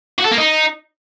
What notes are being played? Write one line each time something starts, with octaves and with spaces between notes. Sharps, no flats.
F#4
A4
A#3
D#4